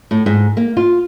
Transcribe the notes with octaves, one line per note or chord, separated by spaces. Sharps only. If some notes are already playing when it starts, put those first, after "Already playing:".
A2
G#2
A#3
F4